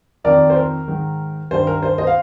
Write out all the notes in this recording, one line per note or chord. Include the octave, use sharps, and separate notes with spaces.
F2 D#3 A#4 D5
C5
A#4
G#2 D#3
G2 D#3 C5
A#4
C5
C5 D#5
F5